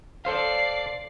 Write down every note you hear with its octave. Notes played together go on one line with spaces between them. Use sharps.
A4 C5 D5 F5 C7